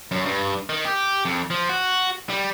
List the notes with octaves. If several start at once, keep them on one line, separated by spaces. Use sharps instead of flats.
F#2
G2
D#3
G4
F2
F3
F#4
G3